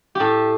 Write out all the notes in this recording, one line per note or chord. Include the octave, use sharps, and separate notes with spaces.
A2 G4 A4